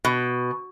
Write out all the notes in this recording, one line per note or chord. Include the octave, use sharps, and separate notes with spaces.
B2